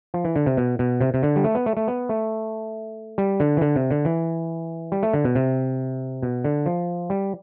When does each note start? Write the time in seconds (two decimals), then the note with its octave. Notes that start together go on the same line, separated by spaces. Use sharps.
0.14 F3
0.24 E3
0.36 D3
0.46 C3
0.57 B2
0.79 B2
1.01 C3
1.14 C3
1.23 D3
1.36 G3
1.44 A3
1.55 B3
1.66 A3
1.77 A3
1.88 B3
2.09 A3
3.18 G3
3.40 D3
3.57 E3
3.61 D3
3.76 C3
3.91 D3
4.05 E3
4.92 G3
5.03 A3
5.14 D3
5.25 B2
5.35 C3
6.23 B2
6.44 D3
6.66 F3
7.10 G3